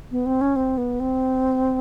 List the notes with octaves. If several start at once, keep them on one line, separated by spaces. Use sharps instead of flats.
B3
C4
C#4
C4
B3
C4